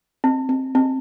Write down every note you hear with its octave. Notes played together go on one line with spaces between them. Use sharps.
C4
C4
C4